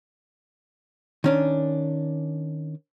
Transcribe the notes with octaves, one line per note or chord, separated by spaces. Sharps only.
D#3 C#4 D4